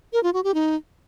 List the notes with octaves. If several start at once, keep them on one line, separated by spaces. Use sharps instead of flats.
A#4
F4
F#4
G4
D#4